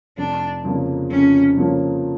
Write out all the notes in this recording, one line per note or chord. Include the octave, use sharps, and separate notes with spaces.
F1 D4
F2 C#3 F3 A#3
F1 C#4
F2 C#3 F3 A#3